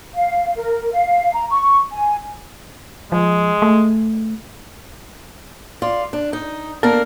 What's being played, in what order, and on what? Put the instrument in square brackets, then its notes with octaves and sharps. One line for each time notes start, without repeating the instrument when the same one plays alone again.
[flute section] F5
A#4
F5
A#5
C#6
G#5
[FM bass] F3 [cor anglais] G#3
[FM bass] A3
[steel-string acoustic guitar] F4 D5
D4
D#4
[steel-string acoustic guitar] A#3 D4 A#4 [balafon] B3